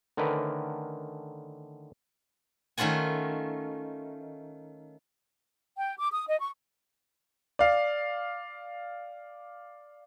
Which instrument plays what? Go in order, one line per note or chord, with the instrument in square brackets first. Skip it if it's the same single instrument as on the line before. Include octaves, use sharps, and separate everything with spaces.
[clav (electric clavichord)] D3 D#3 A3 C#4 A#4 B4
[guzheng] D#3 A3 C#4 F4 F#5 G#5
[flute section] G5
D6
D#6
D#5
C#6
[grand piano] D5 F5